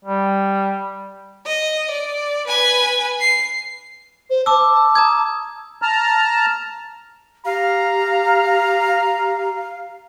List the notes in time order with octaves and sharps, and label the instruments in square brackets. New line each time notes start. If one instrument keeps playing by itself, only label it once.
[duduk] G3
[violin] D#5
D5
B4 G#5
C7
[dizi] C5
[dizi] A5 [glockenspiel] D6 E6
[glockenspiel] A#5 D#6 G#6
[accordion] A5 A#5 F6
[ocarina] G4 [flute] F5 [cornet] A#5